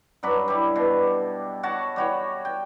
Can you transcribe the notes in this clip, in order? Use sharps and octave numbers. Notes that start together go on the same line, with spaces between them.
G2 F#3 D4 B5
G3 E4
B2
F#4 C#5 F#5 A5
G3 F#4 C#5
G5